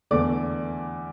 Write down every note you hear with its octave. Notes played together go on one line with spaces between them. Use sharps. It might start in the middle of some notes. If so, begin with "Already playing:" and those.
E2 D3 A3 D5 D6